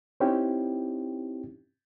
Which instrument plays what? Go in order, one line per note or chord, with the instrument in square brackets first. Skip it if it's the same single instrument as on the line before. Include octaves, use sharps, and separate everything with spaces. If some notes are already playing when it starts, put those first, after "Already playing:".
[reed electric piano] C4 C#4 D#4 E4 G4